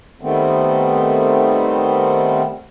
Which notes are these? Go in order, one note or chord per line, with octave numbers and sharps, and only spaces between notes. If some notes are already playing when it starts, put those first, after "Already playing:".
D#3 G3 A3 B3 C4